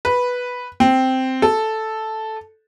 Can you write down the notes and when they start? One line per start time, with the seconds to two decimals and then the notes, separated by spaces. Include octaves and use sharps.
0.05 B4
0.80 C4
1.42 A4